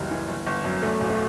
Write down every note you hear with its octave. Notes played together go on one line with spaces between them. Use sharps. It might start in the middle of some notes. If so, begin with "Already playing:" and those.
Already playing: F#1 C#2 E3 G3
E3
G1
G1
F#2
E2 A3
E1
A3